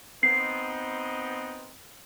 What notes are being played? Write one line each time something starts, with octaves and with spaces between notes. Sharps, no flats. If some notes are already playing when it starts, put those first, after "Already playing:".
B3 C4 D#4 C7